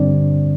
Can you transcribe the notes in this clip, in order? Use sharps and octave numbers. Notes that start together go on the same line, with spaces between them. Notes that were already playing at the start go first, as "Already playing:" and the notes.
Already playing: G2 D3 G3 C4 D4 D5